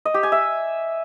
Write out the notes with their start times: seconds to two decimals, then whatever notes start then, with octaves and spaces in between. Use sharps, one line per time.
0.05 D#5
0.14 G4
0.23 G#5
0.32 E5